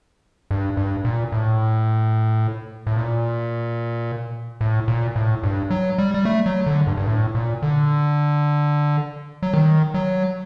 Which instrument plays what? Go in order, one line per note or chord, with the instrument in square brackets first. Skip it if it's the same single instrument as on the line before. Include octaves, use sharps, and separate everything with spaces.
[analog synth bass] G2
G2
A#2
A2
A2
A#2
A2
A#2
A2
G2
F#3
G3
G3
A3
F#3
D3
G2
G2
A2
A#2
D3
F#3
D#3
F#3